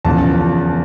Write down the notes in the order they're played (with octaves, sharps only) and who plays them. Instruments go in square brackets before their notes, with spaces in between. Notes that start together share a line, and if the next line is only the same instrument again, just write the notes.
[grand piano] E1 E2 C#3 F3 A5